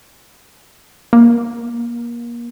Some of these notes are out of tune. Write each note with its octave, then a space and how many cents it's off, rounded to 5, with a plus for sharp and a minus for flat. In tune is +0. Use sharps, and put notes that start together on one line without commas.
A#3 +30